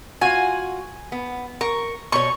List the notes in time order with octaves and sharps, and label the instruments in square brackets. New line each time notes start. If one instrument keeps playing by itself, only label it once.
[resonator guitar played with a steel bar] F4 F#4 [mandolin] G#5
[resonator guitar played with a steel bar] B3
[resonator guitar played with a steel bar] A#4 [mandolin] C#6
[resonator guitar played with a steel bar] B2 C#5 [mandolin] C#6